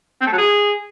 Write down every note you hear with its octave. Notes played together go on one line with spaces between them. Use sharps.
C4
A3
F#3
G#4